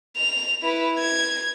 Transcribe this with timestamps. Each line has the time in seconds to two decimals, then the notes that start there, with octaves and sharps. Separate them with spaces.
0.17 F7
0.63 E4 B4
0.99 G#6